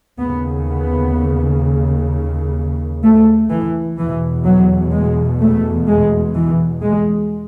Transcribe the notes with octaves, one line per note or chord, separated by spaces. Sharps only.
D#2 C#3 B3
B3
A3
E3
E2 B2 E3
F#3
G#3
A3
G#3
E3
G#3